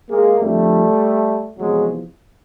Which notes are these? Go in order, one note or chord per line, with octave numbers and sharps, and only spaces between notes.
G#3 A#3
F2 D3 F3 G3 A3
E2 C3 F3 F#3 G#3